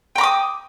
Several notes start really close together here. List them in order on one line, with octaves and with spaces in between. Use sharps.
G5 A#5 D6 D#6